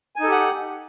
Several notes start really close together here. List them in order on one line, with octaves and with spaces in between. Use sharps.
G#5 D#4 A4 G4 F#5